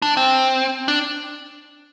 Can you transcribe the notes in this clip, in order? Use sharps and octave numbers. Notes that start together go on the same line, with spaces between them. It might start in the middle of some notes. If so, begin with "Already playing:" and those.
D4
C4
D4